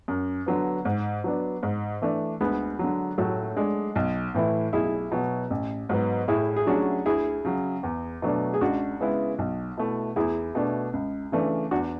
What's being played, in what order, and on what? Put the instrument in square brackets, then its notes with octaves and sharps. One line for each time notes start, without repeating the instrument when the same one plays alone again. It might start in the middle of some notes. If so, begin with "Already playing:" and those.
[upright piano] F#2
D3 F#3 B3
G#2
F#3 B3 D4
G#2
E3 A3 D4
[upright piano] D2 [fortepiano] G#3 B3
[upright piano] D3 F#3
[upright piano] A2 [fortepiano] F#3 A3
[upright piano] G#3 D4
B1
A2 E3 A3 E4
[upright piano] B1 [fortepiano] E4 G#4
[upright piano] B2 F#3
A1
G#2 F#3 B3
[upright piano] A2 [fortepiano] E4 G#4
[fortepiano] G#4
[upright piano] F#3 C#4 [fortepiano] D4 F#4
[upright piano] D2 [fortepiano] E4 G#4
[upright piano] C#3 F#3
E2
B2 F#3 A3 D4
[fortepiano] G#4
[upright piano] C#2 [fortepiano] D4 F#4
[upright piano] C#3 G#3 B3 E4
B1
B2 A3 E4
[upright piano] E2 [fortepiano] E4 G#4
[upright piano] B2 A3 D4
C#2
C#3 E3 A3 D4
[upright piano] E2 [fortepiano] D4 F#4